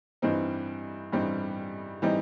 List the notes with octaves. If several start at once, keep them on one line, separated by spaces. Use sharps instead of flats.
G2 E3 G3 C4 D#4
G2 E3 G3 C4 D#4
E3 G3 C4 D#4